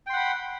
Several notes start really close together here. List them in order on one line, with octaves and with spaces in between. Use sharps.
G5 C6 F#5 B5